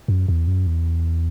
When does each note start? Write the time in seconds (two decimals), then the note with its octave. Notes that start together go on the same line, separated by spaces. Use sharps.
0.08 F#2
0.28 E2
0.47 F#2
0.67 E2